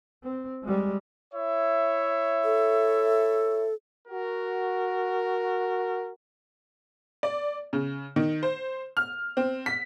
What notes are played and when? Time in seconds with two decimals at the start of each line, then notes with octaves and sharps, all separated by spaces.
0.23 C4
0.64 G3 G#3
1.34 E4 C#5 E5
2.44 A4
4.08 F#4 A#4
7.23 D5
7.73 C#3
8.16 D#3
8.43 C5
8.97 F6
9.37 C4
9.66 B6